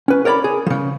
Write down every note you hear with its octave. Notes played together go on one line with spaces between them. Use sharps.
C#4 B4
A#4 C#5 D5 G5 B5
G#4
C#3 F3